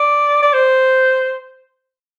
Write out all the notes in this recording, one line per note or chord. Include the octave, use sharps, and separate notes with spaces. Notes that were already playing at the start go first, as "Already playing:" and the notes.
Already playing: D5
D5
C5